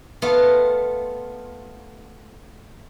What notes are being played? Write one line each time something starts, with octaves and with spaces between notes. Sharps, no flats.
A3 B3 F4